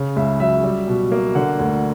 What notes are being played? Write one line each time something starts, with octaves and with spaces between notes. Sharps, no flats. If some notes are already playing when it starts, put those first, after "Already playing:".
Already playing: C#3
C#2 E5
F#3 E5
G3
B2
A#3
D3 F#5
D2